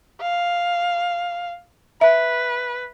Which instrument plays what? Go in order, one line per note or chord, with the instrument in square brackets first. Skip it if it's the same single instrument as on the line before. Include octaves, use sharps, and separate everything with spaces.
[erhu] F5
[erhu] B4 [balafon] E5